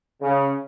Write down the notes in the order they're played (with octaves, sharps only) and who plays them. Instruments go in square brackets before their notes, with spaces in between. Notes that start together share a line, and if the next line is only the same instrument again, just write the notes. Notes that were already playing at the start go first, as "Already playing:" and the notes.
[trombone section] C#3